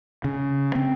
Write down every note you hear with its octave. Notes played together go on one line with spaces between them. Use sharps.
C#3
C4